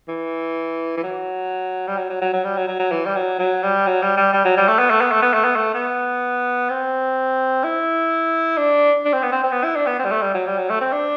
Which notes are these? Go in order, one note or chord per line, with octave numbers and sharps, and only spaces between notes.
E3
E3
F#3
G3
F#3
F#3
F#3
F#3
G3
F#3
F#3
F#3
E3
G3
F#3
F#3
G3
F#3
G3
G3
G3
F#3
G3
A3
B3
A3
B3
A3
B3
A3
B3
A3
B3
C4
E4
D4
D4
C4
B3
C4
C4
B3
E4
D4
B3
C4
G3
A3
G3
F#3
G3
F#3
A3
C4
D4